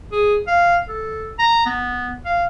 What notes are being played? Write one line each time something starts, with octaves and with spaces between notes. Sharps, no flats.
G#4
F5
A4
A#5
B3
F5